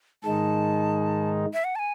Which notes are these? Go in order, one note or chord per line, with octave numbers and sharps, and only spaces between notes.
G#2 D#3 G#3 D#4 A5
E5
F#5
A5
G#5